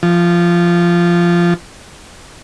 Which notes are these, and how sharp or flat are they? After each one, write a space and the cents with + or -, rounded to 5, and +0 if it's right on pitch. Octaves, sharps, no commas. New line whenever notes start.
F3 -10